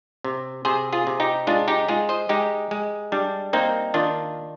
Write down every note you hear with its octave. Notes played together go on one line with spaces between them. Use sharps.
C3
C3 G#4 C5
F4 G#4
C3
D#4 G4
G#3 D4 F4
D#4 G4
G#3 F4 G#4
C5 D#5
G#3 D#4 G4
G#3
G3 D4
A#3 C4 D#4
D#3 D4 F4